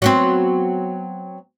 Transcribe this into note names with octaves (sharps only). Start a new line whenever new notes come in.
F#3 B3 C4